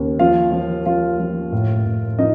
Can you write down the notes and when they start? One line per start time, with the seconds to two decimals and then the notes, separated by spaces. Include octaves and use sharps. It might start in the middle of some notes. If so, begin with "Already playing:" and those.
Already playing: D#2 C#3
0.19 F3 F4 F5
0.52 F3
0.85 F3 F4 F5
1.20 F3
1.52 A2
1.85 A2
2.18 F3 D#4 D#5